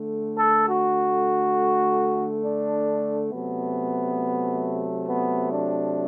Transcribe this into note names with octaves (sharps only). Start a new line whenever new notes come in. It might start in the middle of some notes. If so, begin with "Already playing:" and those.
Already playing: D3 A3
A4
F#4
D4
C3 F#3 A3 B3
B3
D4